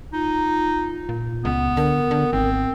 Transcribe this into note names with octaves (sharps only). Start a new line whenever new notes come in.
D#4 F4
A#2
C#2 B3
D3 A#4
D3
G#1 C4